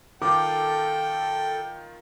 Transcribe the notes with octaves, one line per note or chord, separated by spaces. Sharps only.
D#3 F4 A4 G5 A5 D6